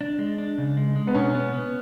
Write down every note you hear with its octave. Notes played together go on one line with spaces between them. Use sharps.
D4
G#3
D4
C#3
G#3
G#3
B3
B2 C#4
B3
B3